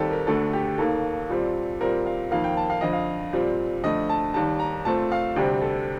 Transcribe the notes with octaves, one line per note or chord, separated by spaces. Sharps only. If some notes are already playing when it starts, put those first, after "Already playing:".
Already playing: D#2 D#3 G3 C4 G4 A4
A#4
D2 D3 A3 A4
G4
D#2 D#3 A#3 A4
A#2 G3 C4
A#2 G3 C4 A#4
F5
F2 D#3 A#3 F5
G5
A5
F5
F2 D3 F3 D#5
F5
A#2 G3 C4
F2 D3 A3 D#5
A5
D#2 D#3 G3 A5
A#5
A#2 A3 C4 A5
F5
D2 C3 G3 C4 G5
A4